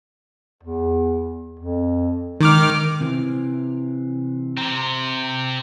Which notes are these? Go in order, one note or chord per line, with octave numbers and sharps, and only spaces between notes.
E2
F2
D#3 G#3 D6 F6
C3 E3 C4
C3 C4 A#5